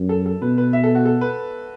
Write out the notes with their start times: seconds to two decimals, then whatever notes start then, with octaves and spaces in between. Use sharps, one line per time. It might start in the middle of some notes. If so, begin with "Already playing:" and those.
Already playing: F#2
0.09 A4
0.26 A4
0.42 B2 B4
0.58 B4
0.73 E5
0.84 A4
0.95 F#4
1.05 A4
1.21 B4